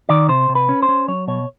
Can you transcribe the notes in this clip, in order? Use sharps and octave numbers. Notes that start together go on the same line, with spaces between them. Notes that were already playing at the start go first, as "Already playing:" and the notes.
D#3 D5
C3 C5
C3
B4
C#4
C5
C#4
F#3 C#5
B2 C#5